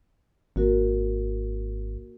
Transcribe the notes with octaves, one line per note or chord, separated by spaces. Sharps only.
G#1 A#3 F#4 A#4